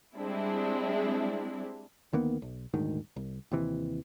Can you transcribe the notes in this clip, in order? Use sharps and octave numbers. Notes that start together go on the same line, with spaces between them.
G3 G#3 C4 D4 E4
D2 D#3 A#3 B3
B1
D#1 D2 G#2 D#3
C2
D#2 C3 E3